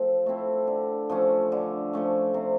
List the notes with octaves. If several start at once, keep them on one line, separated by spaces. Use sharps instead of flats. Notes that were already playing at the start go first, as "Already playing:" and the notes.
Already playing: F3 A3 C4
A3 C4 E4
D3
F3 A3 C#4
D3
F3 A3 C#4
C3